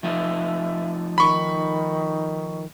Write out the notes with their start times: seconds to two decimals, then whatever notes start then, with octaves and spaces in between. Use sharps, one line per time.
0.03 F3 A3 D#4 E5
1.18 D#3 B5 C#6